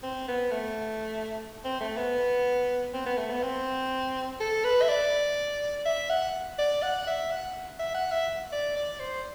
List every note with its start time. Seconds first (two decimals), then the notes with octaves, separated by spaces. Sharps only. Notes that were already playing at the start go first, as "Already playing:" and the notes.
0.03 C4
0.28 B3
0.52 A3
1.65 C4
1.80 A3
1.97 B3
2.94 C4
3.06 B3
3.18 A3
3.31 B3
3.43 C4
4.40 A4
4.64 B4
4.82 E5
4.89 D5
5.86 E5
6.10 F#5
6.58 D5
6.83 F#5
7.07 E5
7.31 F#5
7.79 E5
7.95 F#5
8.11 E5
8.52 D5
8.76 D5
9.00 C5